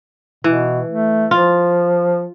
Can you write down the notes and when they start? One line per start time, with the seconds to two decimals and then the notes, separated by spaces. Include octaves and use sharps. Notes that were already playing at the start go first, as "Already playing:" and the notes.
0.44 B2 E3
0.89 A3
1.31 F3 F4